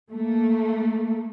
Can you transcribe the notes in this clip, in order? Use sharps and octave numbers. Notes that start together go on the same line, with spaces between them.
A3 A#3